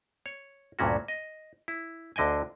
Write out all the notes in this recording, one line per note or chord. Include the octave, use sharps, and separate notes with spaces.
C#5
D2 G2 A#2 C#4 F#4
D#5
E4
D2 D3 D#5 G5 G#5